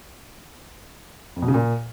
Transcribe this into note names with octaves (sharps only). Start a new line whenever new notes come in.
F2
B2
C#3
A#2